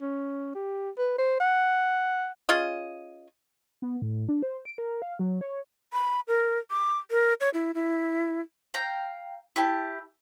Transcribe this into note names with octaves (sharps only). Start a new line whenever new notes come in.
C#4
G4
B4
C5
F#5
C#4 F4 G#4 D#5
B3
A2
D4
C5
D7
A#4
F5
F#3
C#5
B5
A#4
D6
A#4
C#5
E4
E4
F5 G5 A#5
E4 G4 A5